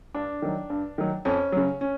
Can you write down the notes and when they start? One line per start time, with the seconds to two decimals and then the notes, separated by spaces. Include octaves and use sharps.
0.14 G2 D4
0.42 D#3 F#3
0.70 G2
0.98 D#3 F#3
1.25 F2 C#4
1.52 C#3 F#3
1.81 C#4